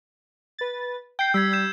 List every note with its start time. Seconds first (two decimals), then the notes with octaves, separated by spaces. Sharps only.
0.59 B4 A6
1.19 G5 G6 C7
1.34 G3 E6 G#6 B6
1.52 E6 G6 E7